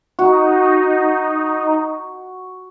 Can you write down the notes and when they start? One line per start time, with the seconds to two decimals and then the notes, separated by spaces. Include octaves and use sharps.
0.19 D#4 F#4